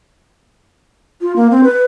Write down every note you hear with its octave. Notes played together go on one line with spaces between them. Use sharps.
F4
A#3
C4
B4